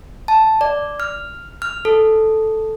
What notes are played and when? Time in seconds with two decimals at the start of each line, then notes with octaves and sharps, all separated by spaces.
0.28 A5
0.61 D5
1.00 F6
1.62 F6
1.85 A4